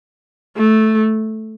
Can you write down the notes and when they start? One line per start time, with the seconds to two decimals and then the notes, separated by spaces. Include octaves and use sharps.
0.57 A3